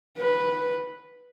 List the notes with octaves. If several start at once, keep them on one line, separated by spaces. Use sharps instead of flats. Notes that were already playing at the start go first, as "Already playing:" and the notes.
B4